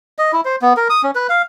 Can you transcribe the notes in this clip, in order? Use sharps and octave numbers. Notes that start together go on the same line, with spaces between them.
D#5
E4
C5
B3
A#4
D#6
C#4
B4
F5